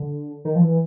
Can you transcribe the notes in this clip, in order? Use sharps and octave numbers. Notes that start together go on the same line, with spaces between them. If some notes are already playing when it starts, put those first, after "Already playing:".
Already playing: D3
D#3
F3
E3